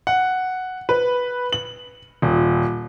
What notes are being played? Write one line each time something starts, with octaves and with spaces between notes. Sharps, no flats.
F#5
B4
F#7
D#1